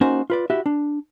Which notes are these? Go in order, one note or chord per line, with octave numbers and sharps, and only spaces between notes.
A#3 C#4 D#4 F#4 A#4 C5
F4 B4 D5
E4 F#4 G4 E5
D4